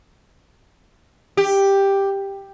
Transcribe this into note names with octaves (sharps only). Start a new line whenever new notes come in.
G4